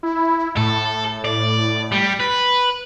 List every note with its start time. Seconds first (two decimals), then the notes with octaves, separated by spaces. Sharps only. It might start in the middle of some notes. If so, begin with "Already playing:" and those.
0.03 E4
0.57 A2 A4
1.25 D5
1.92 G3
2.20 B4